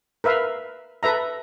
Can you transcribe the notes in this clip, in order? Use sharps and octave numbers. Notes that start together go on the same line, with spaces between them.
A#4 B4 E5 F5
A4 B4 E5 A#5